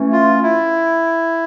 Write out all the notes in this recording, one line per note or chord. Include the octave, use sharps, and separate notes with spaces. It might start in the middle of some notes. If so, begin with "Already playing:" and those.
Already playing: E3 A3 C#4
F4
E4